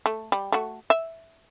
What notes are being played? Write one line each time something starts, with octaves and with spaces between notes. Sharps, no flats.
A3
G3
A3 F#4
E5